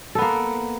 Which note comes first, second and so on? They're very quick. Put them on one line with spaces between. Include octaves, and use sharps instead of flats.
A4 B3 A#3